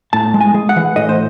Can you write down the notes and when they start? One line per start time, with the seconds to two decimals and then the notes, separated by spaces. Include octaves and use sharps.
0.13 A2 A5
0.34 G#3
0.41 G#5
0.54 G#3
0.69 F#5
0.76 E3
0.96 A2 D#5
1.09 C5